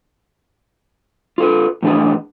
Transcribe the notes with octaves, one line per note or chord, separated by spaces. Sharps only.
F4 A4 B4
A2 E3 D4 G#4 B4